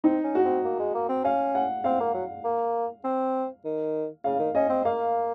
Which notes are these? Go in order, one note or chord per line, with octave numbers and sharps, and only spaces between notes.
C4 D#4
C#4
F#4
C4
A#3
G#3
A#3
C4
C#4 F5
F#5
C4 F5
A#3
F#3
A#3
C4
D#3
C#3 F5
D#3
C#4 D#5
C4
A#3 F5